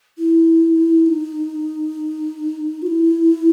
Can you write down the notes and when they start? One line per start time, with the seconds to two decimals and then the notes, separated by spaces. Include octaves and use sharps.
0.18 E4
1.06 D#4
2.82 F#4
2.86 E4